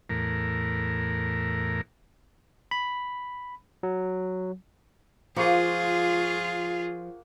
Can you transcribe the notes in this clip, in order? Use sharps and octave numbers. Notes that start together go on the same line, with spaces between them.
E2 A2 A#4
B5
F#3
F3 A#3 F4 G#4 F#5 C#6